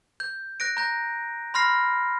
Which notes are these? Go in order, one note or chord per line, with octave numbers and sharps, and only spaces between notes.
G6
F#6 A#6 D7
A#5 G6 A#6
B5 C6 F6 A#6 C7